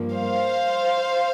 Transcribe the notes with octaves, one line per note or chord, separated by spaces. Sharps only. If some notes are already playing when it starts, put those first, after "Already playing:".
Already playing: G2 F3 A#3
C5 F5